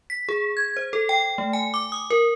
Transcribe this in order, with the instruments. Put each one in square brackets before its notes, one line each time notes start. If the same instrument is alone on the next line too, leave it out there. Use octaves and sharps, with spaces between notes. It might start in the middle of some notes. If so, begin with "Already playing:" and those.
[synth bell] B6
G#4
G#6
C5
A4
G5
A3
G#5
D6
D#6
A#4